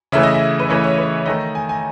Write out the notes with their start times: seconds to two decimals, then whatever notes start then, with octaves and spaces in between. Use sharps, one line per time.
0.12 C#3 E3 A3 E5
0.23 D#5
0.34 E5
0.59 B4
0.69 C#3 E3 A3 C#5
0.84 C#5
0.98 B4
1.26 D#3 A3 D#5
1.55 G#5
1.69 G#5